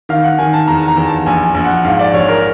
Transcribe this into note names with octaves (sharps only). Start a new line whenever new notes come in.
D#3 F5
F#5
D#3 G#5
A5
E2 A#5
A#5
E2
A5
A#1 G#5
G#5
A#1
F#5
G#2 F5
D5
A#1 C#5
A#4